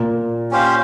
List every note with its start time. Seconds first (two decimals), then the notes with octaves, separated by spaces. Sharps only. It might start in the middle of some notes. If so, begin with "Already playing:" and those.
Already playing: A#2
0.51 C#4 G4 C5 F5